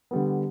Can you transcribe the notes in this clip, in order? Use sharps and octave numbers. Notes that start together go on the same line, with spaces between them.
D3 G3 B3